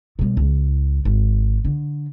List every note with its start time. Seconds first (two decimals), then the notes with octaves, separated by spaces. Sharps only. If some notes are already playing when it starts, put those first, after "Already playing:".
0.19 B2 G3
0.37 C#2
1.05 G#1
1.65 D3